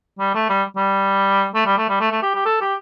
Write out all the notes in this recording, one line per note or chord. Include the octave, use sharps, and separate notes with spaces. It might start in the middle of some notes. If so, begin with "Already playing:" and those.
G3
A3
G3
G3
A3
G3
A3
G3
A3
A3
G4
G4
A4
G4